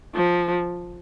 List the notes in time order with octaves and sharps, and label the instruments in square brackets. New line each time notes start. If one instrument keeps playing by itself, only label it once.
[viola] F3